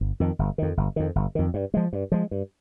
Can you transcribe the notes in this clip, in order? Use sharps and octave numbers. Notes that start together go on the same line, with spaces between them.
G1
F2 D#3
G1
F2 D#3
G1
F2 D#3
G1
F2 D#3
G2
F3 G#3
G2
F3 G#3
G2